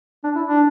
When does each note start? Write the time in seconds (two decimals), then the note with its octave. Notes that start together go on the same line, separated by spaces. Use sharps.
0.24 D4
0.36 E4
0.47 D4